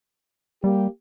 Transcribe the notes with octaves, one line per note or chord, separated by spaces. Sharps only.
G3 A#3 G4